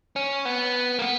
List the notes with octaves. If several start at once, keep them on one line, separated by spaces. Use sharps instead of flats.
C#4
B3
A#3
B3